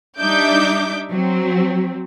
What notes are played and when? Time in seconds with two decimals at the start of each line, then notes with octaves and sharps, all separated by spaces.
0.19 G3 D4 D#4 E5 D6 G6
1.11 F#3 C4